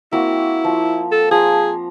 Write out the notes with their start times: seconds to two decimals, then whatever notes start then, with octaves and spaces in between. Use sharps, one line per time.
0.13 A#3 C4 E4 F#4
0.64 F3
1.11 A4
1.31 F3 G#4 A#5